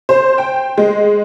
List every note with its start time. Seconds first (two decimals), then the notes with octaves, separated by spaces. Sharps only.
0.09 C5
0.38 G5
0.78 G#3